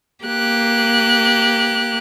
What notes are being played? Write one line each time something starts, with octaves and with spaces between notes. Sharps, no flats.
A#3 G4 F#6